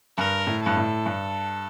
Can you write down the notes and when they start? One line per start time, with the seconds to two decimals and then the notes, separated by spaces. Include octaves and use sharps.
0.17 G2 A#4
0.47 A2
0.62 G2 A4
0.77 A2
1.06 G2